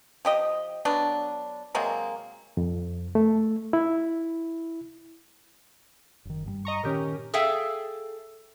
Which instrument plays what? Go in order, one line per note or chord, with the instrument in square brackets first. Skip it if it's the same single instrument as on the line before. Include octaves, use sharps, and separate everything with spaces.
[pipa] F3 G4 D#5
F#3 B3 D4
C3 F#3 G#3 A#3
[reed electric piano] F2
A3
E4
[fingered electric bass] F#1 D#3
G2 F#3 G3
[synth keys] D#5 A#5 C#6
[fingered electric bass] A#2 D#3 [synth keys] C#4 G4 A#4
[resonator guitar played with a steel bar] G#4 A4 E5 F5 G5